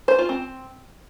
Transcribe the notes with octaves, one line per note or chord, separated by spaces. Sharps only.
C5
F4
C4